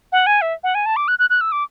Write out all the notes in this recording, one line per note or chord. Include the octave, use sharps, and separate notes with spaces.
F#5
G#5
E5
F#5
G#5
A5
D6
F#6
F#6
F#6
E6
D6